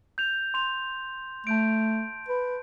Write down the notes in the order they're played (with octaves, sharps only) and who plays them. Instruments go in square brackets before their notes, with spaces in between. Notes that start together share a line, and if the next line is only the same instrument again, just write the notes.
[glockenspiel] G6 F7
C6 F7
[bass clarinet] A3 [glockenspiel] A5 G6 D7
[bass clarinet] B4